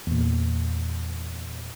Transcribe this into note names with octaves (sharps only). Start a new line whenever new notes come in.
E2 A#2